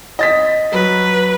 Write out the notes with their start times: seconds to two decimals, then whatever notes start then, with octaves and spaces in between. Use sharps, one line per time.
0.19 D#5 A6 B6
0.73 F#3 B4